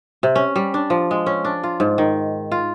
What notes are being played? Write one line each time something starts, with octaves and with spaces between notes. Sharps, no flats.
C3
C#4
G3
D4
F3
G#3
C#4
D4
F4
G#2
D#3
F4